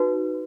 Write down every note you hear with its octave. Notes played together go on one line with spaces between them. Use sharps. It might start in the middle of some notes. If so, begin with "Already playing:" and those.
Already playing: D#4 F#4 B4